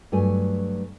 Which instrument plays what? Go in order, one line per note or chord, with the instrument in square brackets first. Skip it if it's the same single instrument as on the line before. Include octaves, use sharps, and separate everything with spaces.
[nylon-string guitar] G2 F#3 A3 G#5